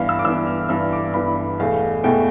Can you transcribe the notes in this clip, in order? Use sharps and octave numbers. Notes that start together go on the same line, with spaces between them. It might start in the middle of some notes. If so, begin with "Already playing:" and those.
Already playing: G2 E3 B3 F5 B5
E6
D6
G2 E3 B3 E6
F6
G2 E3 B3 E6
D6
G2 E3 B3 B5
E2 B2 A3 F5
E2 B2 A3 G5